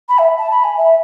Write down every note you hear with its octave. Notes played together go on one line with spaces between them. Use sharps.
B5
E5
A5
B5
G#5
E5